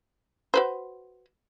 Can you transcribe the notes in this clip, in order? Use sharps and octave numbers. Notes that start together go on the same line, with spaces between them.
F#4 B4 C5